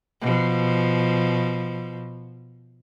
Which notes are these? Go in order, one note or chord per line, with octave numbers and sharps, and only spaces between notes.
B2 F3